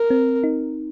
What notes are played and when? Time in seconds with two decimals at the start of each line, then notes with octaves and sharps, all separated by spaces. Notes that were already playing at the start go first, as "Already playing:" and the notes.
Already playing: A#4
0.10 C4
0.44 D#4